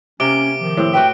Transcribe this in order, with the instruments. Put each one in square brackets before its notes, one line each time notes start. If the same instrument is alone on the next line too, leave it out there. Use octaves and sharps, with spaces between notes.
[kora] C3 A#3 [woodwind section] C#4 [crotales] D6 D7 G7
[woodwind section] D#3 F3
[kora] A2 C4
[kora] F#4 B4 E5 [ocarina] G5